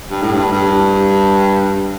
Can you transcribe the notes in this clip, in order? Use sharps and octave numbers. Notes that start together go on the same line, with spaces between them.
G2
A2
G2
G2